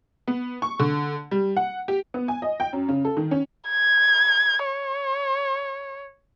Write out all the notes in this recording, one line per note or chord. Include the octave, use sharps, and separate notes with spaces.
B3
C#6
D3
G3
F#5
G4
B3
G#5
D#5
G5
F#2
C#3
A4
D#3
C#4
G#6
C#5